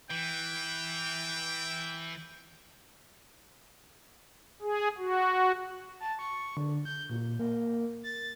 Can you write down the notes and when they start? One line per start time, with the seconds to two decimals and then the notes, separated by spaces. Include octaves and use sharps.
0.11 E3 G5
4.62 G#4
4.98 F#4
6.00 A5
6.19 C#6
6.57 D3
6.85 G6
7.10 A#2
7.39 A#3
8.04 A6